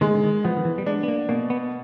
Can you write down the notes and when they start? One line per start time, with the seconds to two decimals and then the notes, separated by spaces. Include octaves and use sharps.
0.01 D#3 G#3
0.15 D3
0.23 D#3
0.44 F3 B3
0.57 D#3
0.65 E3
0.78 G3
0.86 G#3 D4
1.03 B3
1.08 A#3
1.29 B2 A#3
1.50 B3